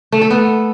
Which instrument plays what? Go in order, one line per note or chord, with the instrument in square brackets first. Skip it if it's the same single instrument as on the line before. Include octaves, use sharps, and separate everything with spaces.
[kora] A3
A4
B3